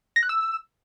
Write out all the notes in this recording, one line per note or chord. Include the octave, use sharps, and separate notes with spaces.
A#6
F#6
E6